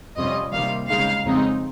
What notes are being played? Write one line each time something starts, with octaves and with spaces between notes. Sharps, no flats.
F2 C3 G3 C#4 F4 D#5
C3 D#3 G3 A#3 F5
C#3 G#3 D#4 F5
F2 C#3 G#3 C4 D#4